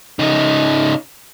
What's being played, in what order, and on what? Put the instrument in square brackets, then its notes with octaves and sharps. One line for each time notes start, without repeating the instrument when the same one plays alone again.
[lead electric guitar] C#3 D#4